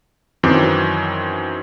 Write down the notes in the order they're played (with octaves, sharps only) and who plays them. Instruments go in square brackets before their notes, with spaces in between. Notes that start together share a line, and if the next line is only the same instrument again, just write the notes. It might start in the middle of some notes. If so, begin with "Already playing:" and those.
[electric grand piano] F#2 D#3 E3 C4 F#4 D6